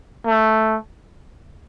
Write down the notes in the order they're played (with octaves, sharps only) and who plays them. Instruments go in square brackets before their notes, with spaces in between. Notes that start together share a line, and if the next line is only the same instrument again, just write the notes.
[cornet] A3